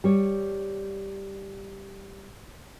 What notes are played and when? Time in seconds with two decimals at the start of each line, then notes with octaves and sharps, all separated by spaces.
0.04 G3 C#5